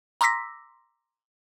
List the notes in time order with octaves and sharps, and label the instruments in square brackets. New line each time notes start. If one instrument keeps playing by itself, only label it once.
[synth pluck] A#5 C6 D6 E6 A#6 B6